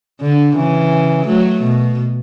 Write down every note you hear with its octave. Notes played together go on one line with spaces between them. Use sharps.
D3
C#3 E3
F#3 A3
B2